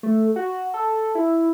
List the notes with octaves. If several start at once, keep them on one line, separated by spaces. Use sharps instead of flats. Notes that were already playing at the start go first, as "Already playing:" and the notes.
A3
F#4
A4
E4